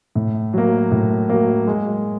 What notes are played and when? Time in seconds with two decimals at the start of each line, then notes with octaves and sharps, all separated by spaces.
0.15 A2
0.53 F#3 A#3
0.92 A2
1.29 F#3 A#3
1.67 G#3